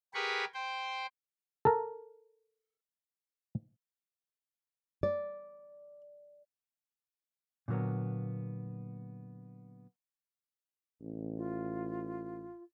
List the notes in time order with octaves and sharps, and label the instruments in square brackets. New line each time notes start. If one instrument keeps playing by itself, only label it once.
[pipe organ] G4 G#4 A#4 B4 B5 C#6
C5 G5
[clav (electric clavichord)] A4 A#4
[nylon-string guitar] D5
[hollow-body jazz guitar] A#2 D3 F#3 A#3 B3
[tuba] A1
[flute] F4